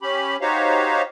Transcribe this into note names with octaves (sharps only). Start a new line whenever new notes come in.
C#4 G4 B5
D#4 F#4 G4 C5 C#5 F5